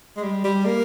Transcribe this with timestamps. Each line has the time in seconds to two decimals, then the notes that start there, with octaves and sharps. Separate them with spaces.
0.17 G#3
0.23 G3
0.44 G3
0.65 A#3